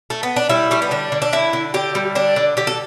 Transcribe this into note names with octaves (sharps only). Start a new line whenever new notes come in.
A3
B3
D4
G3 E4
G3 A3
B3
D3 D4
D3
D4
D3 E4
D3
D3 G4
G3
D3 D4
D3
D3 G4
A4